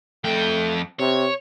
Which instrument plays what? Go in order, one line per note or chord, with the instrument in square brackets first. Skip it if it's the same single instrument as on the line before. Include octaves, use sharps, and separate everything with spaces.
[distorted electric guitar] F2 G5 [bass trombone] A3
[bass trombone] C3 [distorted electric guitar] C#5